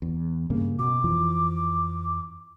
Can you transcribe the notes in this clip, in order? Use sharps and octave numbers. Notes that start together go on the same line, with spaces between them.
E2
G2 C#3 A#3
B2 D6
F2 E3 F3